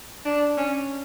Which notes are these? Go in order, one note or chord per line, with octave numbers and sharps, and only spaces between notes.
D4
C#4